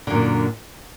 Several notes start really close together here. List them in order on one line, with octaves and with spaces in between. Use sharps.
D3 F#2 A#2